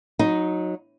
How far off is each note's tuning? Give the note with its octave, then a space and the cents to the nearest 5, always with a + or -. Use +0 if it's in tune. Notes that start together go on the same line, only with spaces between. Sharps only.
F#3 -20 D#4 +0